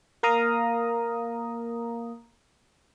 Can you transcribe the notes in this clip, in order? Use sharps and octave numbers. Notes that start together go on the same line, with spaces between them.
A#3 A#4 F5 A#5 D#6